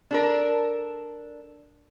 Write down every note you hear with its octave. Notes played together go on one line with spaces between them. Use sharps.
D4 A4 A#4